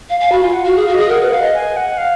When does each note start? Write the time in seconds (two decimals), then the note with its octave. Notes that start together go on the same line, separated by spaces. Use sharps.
0.10 F5
0.20 F5 G#5
0.32 F#4 B5
0.43 F4 G#5
0.53 F#5
0.65 F#4 F5
0.76 G#4 F5
0.88 F#4
0.94 G#4 D#5
1.09 A#4 F#5
1.21 B4
1.32 F5
1.42 D#5
1.54 G#5
1.77 F#5
1.98 F5